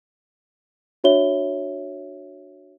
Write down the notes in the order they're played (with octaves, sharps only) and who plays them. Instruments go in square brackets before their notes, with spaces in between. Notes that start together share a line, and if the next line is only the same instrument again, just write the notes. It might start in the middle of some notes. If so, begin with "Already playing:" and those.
[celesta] D4 F#4 C#5 E5 G7